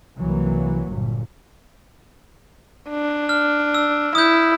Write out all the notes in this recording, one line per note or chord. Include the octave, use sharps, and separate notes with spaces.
C2 E3 F#3 A#3
G1 A#2
D4
F6
E6
E4 D#6 G6